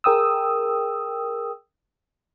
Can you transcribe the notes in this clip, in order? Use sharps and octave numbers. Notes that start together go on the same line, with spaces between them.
G#4 A#4 G5 D#6 E6